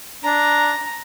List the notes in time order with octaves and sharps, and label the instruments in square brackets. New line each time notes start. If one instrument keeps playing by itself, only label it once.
[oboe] D4 [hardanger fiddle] A#5